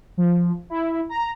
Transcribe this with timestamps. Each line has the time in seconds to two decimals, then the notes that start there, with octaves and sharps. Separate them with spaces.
0.17 F3
0.70 E4
1.09 A#5